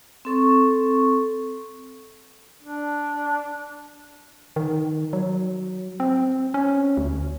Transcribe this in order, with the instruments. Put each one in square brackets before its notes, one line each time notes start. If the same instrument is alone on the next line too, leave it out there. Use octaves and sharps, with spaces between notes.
[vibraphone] C4 A4 C#6
[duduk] D4
[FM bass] D#3
F#3
C4
C#4
D2